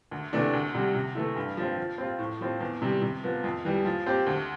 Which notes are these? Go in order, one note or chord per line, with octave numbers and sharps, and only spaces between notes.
D2
C3 E3 A3 D4
D2
C3 G3
C3
E3 A3 E4
G2
F3 C4
F3
C4 F4
A2
F3 C4
E2
C3 G3
C3
F3 B3
F2
E3 G3
F3
C4 G4
D2